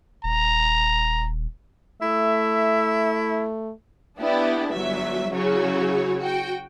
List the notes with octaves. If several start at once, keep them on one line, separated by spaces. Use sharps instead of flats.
D#1 A#5
A3 E4 E5
B3 D4 E4 G4
G1 F#3 E5
C#3 F#3 E4 F#4 C#5
F#4 G5